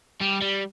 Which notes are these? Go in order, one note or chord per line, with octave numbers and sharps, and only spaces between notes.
G3
G3